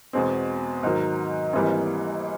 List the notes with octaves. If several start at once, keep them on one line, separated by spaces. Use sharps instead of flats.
E2 B2 G#3 C4
G#2 D#3 F#3
G#1 G#2 E3 G3 A#3